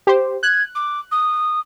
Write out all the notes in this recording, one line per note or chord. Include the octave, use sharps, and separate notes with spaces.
G4 C5
F#6 G#6
D6
D#6